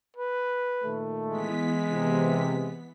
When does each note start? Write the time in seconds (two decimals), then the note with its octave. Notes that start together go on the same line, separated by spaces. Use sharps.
0.17 B4
0.84 A#2 D#3 A3
1.28 E3 G#3 B3 B6
1.90 C3